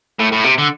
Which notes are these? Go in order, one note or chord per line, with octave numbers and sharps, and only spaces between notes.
A2
A2
C3
D3